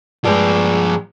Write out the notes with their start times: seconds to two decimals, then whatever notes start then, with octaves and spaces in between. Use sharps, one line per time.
0.25 G2 F3 G#3 D5